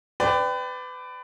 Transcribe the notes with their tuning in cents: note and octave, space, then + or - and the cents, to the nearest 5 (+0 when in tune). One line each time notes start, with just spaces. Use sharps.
B4 +30 D5 +0 G5 +0